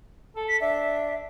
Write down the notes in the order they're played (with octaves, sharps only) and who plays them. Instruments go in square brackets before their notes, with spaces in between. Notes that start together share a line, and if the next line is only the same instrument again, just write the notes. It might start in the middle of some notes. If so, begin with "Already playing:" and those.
[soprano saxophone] A4 [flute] A5
[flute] B6
[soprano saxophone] D4 [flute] E5